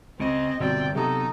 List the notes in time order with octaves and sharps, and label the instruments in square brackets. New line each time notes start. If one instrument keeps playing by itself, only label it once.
[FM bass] C#2 [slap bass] C#3 [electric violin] C4 [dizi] D#5
[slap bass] G1 C2 [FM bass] B2 [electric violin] C4 G5 [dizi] D5
[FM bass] C3 [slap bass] F#3 B3 [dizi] D#4 [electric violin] A4